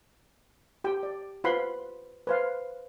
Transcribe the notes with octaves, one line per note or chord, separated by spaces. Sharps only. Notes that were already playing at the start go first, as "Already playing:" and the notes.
G4 G5
D5
F4 B4 C5 F#5 B5 C6
B4 C5 F5